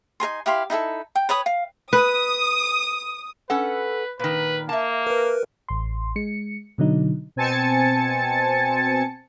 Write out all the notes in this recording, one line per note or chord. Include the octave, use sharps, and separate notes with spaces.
D#4 A#4 G#5 C6
E4 G4 F5 C6
D#4 E4 G#4 A4
G5
B4 C#5 B5 D#6
F5
B4 D#6
C#4 A4 B4 F#5
A#2 D#3 B4
A#3 E5 A5
A#4 B4
A1 C6
G#3 C#7
B2 D3 F#3 D#4
B2 C4 G#5 A5 A6 C#7